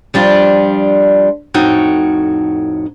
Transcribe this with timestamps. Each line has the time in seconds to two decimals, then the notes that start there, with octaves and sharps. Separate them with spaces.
0.14 F3 G3 D4 F4
1.54 F2 A2 D#4 F#4 C#5 G5